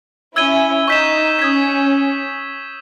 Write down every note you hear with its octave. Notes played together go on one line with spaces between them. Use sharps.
C#4 E4 E6 G#6 D#7 G7
D#4 C#6 G6 B6 E7
C#4 D#6 G#6 B6